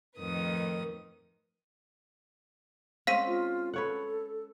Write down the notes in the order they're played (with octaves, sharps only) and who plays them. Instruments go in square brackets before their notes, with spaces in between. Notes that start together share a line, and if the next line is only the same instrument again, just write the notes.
[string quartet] F2 A2 D#3 B4 D#6
[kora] G#3 C4 C#4 [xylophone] F5 B6 D#7
[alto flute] F4
[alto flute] A4 [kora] B4 C#5 F#5